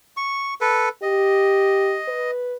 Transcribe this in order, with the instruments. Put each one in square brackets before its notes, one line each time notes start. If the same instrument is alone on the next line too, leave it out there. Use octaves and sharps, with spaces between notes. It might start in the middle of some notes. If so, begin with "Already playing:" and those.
[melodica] C#6
A4 B4
[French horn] G4 [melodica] D#5
[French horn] B4